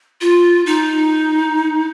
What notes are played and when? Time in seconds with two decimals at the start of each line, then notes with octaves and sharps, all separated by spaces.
0.21 F4
0.66 D#4